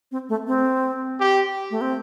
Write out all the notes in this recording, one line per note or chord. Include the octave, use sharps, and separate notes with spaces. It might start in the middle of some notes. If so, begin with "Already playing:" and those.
C4
A3
C4
G4
A3
C4